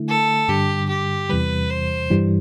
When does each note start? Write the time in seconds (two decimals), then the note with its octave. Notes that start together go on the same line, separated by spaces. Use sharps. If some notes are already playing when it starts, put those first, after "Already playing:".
Already playing: D3 A3 E4
0.08 A4
0.48 G2 D3 G3 G4
0.89 G4
1.29 E2 C3 E3 G3 B4
1.70 C5
2.10 G2 E3 G3